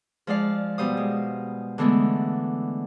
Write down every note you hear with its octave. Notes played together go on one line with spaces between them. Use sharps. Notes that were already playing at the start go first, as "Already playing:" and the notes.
F3 G#3 D5 F5
B2 G3 C5 F5 D#6
G#3
D3 E3 G#3 A3 B3